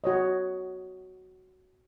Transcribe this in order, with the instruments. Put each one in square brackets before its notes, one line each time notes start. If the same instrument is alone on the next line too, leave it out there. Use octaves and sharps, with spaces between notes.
[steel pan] F#4 C#5 D#5